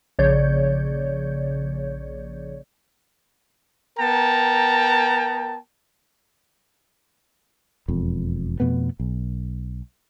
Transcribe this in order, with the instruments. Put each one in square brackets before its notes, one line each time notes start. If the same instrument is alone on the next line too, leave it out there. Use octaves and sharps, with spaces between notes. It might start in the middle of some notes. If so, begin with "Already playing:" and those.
[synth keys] A#1 C#3 C#5 D5 G6
[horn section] B3 A#4 G5 A5 A#5
[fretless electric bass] E1 F2
F2 B2 A3 B3
B1